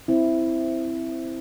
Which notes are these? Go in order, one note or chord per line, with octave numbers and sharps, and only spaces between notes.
C4 E4